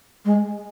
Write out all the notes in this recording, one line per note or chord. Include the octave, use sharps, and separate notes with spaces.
G#3